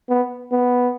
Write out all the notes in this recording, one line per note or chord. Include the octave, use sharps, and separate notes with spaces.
B3
B3